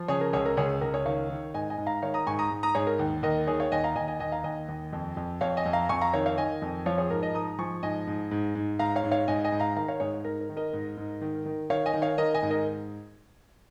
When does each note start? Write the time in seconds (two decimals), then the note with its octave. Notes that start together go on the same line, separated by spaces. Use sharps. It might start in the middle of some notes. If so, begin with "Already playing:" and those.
Already playing: F3
0.08 C#3 G#4 C#5
0.21 A#4
0.33 C#2 G#4 C#5
0.45 A#4
0.57 C#2 G#4 C#5
0.81 C#2 A#4
0.94 G#4 C#5
1.06 D#3 C#5 F5
1.30 D#3
1.54 G#2 D#5 G#5
1.70 D#5 G#5
1.78 G#2
1.87 F5 A#5
2.02 D#3 C#5 F5
2.14 A#5 D#6
2.27 G#2 G#5 C#6
2.39 A#5 D#6
2.51 G#2
2.63 A#5 D#6
2.75 G#2 G#4 C#5
2.87 A#4
2.99 D#2
3.23 D#2 A#4 D#5
3.47 D#3 G#4 C#5
3.60 C#5 F5
3.72 D#2 D#5 G#5
3.84 F5 A#5
3.96 D#2 D#5 G#5
4.08 D#5 G#5
4.20 D#2 D#5 G#5
4.32 F5 A#5
4.44 D#2 D#5 G#5
4.69 D#2
4.93 F2
5.17 F2
5.41 F2 C#5 F5
5.57 D#5 G#5
5.66 F2
5.73 F5 A#5
5.89 F2 G#5 C#6
6.01 F5 A#5
6.14 D#3 C#5 F5
6.26 C#5 F5
6.38 D#3 D#5 G#5
6.62 F2
6.86 F3 C#5 F5
6.98 G#4 C#5
7.10 G#2 A#4
7.22 A#4 D#5
7.34 G#2 A#5 D#6
7.59 F3 G#5 C#6
7.83 G#2 D#5 G#5
8.07 G#2
8.31 G#2
8.55 G#2
8.79 G#2 F5 A#5
8.96 C#5 F5
9.04 G#2
9.11 C#5 F5
9.28 G#2 D#5 G#5
9.44 D#5 G#5
9.52 G#2
9.60 F5 A#5
9.76 D#3 F5 A#5
9.88 C#5 F5
10.00 G#2 G#4 C#5
10.25 G#2 A#4
10.40 A#4
10.49 D#3
10.57 A#4 D#5
10.73 G#2
10.97 G#2
11.21 D#3
11.46 D#3
11.70 D#3 C#5 F5
11.86 D#5 G#5
11.94 D#3
12.02 C#5 F5
12.18 D#3 A#4 D#5
12.34 D#5 G#5
12.43 G#2
12.50 A#4 D#5